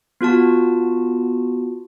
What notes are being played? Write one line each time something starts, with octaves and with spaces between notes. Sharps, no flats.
B3 F4 F#4 A5